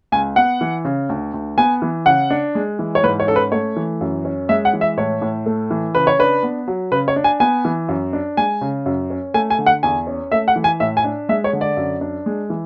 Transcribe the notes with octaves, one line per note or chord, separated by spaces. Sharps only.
C#2 G#5
B3 F#5
E3
C#3
D2
D2
B3 G#5
E3
C#3 F#5
D4
G#3
E3
C#5
G#2 B4
C#5
C#4 A4
B4
A3 C#5
E3
F#2
C#4
G#3 E5
F#5
E3
E5
A2 C#5
A2
A3
E3
C#3 B4
C#5
D4 B4
B3
F#3
C#3 B4
C#5
D4
G#5
B3 G#5
E3
F#2
D4
G#3 G#5
C#3
F#2
C#4
A3 G#5
G#5
D3
F#5
E2 G#5
C#4
A3 E5
F#5
E3
G#5
A2 E5
G#5
D4
G#3 E5
C#5
D3
D5
F#2
D4
G#3
E3